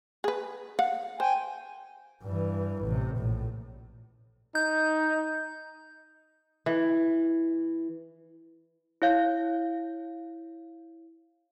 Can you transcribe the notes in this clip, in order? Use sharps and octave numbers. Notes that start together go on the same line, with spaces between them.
G#4 B4
F5 F#5
C5 G5 G#5
G2 E3
A1 C3
A#1 A2
D#4 G6
E3
E4 C#5 F5 G6